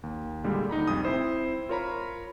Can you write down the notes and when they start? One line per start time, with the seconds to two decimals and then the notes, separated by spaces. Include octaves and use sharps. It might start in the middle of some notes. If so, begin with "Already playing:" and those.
0.03 D#2
0.44 A#2 D3 G3 G#3
0.69 D2 D#4 A#5 B5
0.87 C2 F2 D#6
1.05 C4 E4 C5
1.69 F4 A#4 C#5 A#5 B5